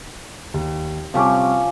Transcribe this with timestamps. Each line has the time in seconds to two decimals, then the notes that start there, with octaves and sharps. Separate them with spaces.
0.54 D#2
1.14 C3 F3 G3 C#4 G4 D6